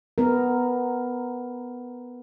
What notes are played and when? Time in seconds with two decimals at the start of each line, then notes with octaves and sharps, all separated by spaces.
0.18 B3 A#4